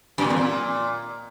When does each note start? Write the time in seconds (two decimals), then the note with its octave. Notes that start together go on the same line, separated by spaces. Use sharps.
0.18 F#2
0.24 A#2
0.30 E2
0.36 A#2